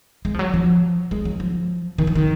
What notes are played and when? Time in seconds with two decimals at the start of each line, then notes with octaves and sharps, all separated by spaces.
0.25 G#3
0.34 F3
0.39 F#3
0.54 F3
1.11 G#3
1.25 F#3
1.40 F3
1.98 D#3
2.07 F3
2.15 D#3